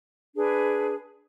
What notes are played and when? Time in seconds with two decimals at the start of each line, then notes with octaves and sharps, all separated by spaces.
0.36 D4 G#4 B4